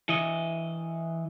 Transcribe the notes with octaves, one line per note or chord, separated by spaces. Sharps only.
E3 D#5